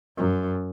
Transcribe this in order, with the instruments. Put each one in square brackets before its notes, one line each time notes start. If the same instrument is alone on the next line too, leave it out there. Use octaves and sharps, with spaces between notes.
[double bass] F#2